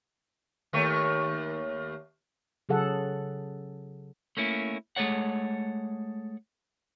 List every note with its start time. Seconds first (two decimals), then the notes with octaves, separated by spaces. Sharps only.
0.73 D#2 A3 C#5
2.69 C#3 F#3 G#4 A4 F#5
4.37 A3 A#3 C#4 E4
4.96 G#3 A3 G#4 A4 C#5 F#5